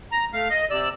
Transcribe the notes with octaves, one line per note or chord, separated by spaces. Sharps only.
A#5
A3 F5
D#5
C3 D5 E6